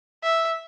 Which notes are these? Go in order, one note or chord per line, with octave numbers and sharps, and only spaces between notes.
E5